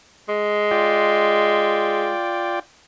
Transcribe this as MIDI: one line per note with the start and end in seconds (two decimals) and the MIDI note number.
0.29 2.13 56
0.71 2.59 65
0.71 2.59 74
0.71 2.59 79